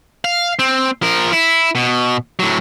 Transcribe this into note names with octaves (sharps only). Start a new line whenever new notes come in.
F5
C4
F3 A#4
E4
B2
A2 F#3